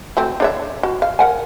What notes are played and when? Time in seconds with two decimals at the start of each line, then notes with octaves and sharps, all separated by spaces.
0.17 F#3 A3 C4
0.40 D4 C#5 E5
0.83 F#4
1.02 F5
1.19 A#4 F#5 G#5